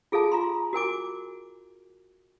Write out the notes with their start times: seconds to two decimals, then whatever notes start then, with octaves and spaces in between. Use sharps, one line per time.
0.12 F4 G#4 A4 F5 A5
0.32 F4 A#5 C6
0.73 F#4 A#4 G#5 D6